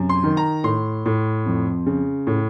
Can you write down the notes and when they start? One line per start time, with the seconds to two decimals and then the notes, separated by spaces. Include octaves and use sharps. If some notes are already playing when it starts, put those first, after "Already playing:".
Already playing: F#2 C3
0.09 C6
0.24 D#3
0.37 A#5
0.64 A2 C6
1.06 A2
1.46 F2
1.86 C#3
2.27 A2